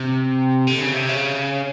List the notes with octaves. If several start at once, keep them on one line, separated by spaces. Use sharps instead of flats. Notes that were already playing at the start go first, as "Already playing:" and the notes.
Already playing: C3
D3
C#3
C3
C#3